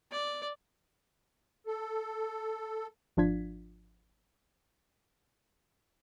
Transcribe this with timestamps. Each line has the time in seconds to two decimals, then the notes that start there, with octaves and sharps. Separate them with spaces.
0.11 D5
1.67 A4
3.17 G#1 F3 D4 F4 G#6 B6